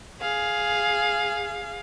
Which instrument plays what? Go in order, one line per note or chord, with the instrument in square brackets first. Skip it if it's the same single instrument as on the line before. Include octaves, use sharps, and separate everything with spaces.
[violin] G#4 F5